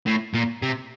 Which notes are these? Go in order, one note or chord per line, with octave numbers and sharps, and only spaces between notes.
A2
A#2
C3